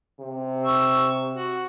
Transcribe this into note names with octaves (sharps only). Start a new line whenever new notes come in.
C3
C#6 E6
F#4